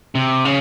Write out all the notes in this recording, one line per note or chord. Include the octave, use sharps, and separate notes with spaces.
C3
C#3